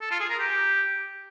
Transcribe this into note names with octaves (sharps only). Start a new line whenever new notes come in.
A4
F4
G#4
A#4
G4